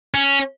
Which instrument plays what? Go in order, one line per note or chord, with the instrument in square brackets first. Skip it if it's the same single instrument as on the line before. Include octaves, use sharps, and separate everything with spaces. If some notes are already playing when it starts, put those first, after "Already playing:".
[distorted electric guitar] C#4